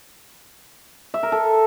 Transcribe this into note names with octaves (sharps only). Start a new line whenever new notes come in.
E5
A#4
A4